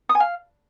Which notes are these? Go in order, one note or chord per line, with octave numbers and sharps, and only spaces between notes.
D#6
G#5
F5